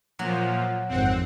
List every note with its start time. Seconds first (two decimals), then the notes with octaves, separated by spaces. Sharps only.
0.19 A#2 F3 F#3
0.89 G#1 F2 C4 F#5